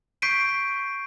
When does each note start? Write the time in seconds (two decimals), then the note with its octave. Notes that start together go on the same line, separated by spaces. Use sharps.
0.22 C#6 G6 B6 C7 D7 D#7